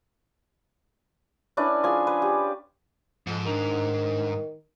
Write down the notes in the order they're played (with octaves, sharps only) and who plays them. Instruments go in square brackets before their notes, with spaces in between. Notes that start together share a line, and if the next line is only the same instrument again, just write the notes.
[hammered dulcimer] C#4 D4 E4 B4
F3 G#4 G#5
B4
G4
[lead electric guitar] G#2 [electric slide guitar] F3 A4 D#5
[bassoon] D#3 [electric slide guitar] D4 C#5 A#5